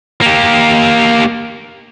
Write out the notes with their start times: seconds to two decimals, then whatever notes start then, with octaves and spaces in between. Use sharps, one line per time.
0.22 A#3 G4